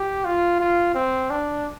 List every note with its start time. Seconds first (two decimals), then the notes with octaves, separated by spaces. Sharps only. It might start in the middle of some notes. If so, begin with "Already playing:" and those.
Already playing: G4
0.25 F4
0.60 F4
0.95 C4
1.30 D4